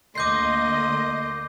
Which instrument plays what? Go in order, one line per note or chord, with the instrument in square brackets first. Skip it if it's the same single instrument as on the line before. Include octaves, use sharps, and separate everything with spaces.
[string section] D2 A#3 D#5 [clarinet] C6 [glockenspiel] D6 G6 C7